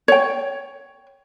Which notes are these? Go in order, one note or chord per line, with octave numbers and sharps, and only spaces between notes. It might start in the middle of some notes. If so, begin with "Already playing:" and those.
C#5 G5